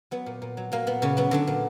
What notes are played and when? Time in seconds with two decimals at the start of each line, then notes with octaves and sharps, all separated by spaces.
0.11 F#3 B3
0.26 A#2
0.42 A#2
0.57 F#3
0.72 F#3 A#3
0.87 A#2 B3
1.02 A#2 C#3 C#4
1.17 F#3 B3
1.31 D3 F#3 D4
1.47 A#2